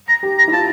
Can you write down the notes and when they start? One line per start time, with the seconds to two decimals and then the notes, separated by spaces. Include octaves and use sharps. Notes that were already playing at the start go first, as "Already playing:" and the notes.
0.09 A#5
0.23 G4
0.38 A#5
0.48 E4
0.52 F4 A5